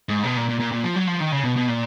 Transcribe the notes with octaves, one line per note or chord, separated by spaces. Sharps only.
G#2
B2
A#2
A#2
A#2
A#2
F3
F#3
F3
D#3
C#3
B2
B2
A#2